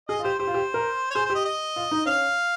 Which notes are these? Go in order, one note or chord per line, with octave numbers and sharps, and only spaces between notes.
G#4 D#5
F4
G4 C5
G4 C5
F4
G4
A#4
C#5
G#4 C5
G4 C5
D#5
D#5
F4
D#4
C#4 F5